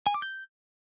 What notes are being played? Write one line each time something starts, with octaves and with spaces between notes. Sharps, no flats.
G#5
D6
G6